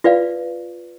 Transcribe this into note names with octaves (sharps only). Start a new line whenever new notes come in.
F4 B4 D5 F5